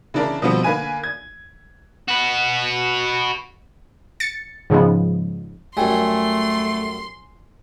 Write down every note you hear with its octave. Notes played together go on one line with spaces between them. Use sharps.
C#3 E3 D4 E4 A#4
B2 D3 F3 G3 B3 C4
D3 A#3 B4 G#5 D#7
G#6
F#4 B4
A6 C#7
G#2 C#3 F3 G#3 B3
F#2 G3 A3 G#5 C6